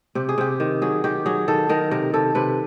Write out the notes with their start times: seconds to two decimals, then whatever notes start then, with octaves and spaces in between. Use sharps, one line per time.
0.15 C3 G4
0.29 G#4
0.38 C3 G4
0.60 D#3
0.82 F#3 G#4
1.04 D#3 G4
1.26 F#3 G#4
1.48 D#3 A4
1.69 D#3 A#4
1.91 C3 A#4
2.14 C3 A4
2.35 C3 B4